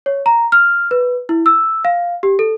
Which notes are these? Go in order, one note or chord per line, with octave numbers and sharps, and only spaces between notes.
C#5
A#5
F6
B4
E4
E6
F5
G4
A4